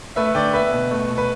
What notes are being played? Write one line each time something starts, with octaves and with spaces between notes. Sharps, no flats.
A3 B4 E5
D3 D5 G5
B3 B4 E5
B2
A3
B2
B4